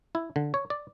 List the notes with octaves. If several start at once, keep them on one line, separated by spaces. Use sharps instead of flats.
E4
D3
C#5
D5